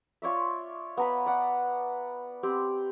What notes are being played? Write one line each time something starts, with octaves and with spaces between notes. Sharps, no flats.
F4 C#5 D5 E5
B3 A#5 B5
D5 F#5
C4 G4